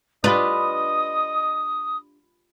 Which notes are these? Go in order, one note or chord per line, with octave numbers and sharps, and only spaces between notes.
D4 F4 G4 B4 D#5 D#6